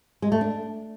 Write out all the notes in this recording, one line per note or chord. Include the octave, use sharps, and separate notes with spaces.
G#3
A3
D4